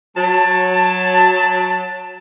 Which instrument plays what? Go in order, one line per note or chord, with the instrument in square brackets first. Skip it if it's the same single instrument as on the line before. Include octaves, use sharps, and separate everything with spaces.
[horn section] F#3 A5